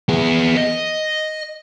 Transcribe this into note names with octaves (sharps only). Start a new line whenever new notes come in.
B3 G#4
D#5